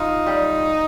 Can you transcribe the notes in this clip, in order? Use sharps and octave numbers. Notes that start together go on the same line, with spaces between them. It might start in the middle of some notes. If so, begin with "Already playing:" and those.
Already playing: D#4 F4
G3